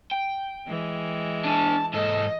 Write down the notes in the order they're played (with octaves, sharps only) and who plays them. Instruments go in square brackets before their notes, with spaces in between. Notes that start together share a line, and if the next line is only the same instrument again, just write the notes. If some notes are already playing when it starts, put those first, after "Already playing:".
[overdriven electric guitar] G5
[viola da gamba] E3 G#3
[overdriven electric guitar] D4 G#5 [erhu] A5
[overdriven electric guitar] G#2 A4 [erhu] D#5